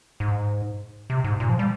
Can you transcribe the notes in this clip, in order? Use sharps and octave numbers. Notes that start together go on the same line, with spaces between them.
G#2
C3
G#2
A#2
F3
G3